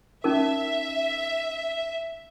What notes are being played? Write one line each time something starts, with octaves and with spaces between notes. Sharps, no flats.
C#4 D#4 A#4 E5